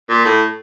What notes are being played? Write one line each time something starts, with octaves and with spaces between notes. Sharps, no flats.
A#2
A2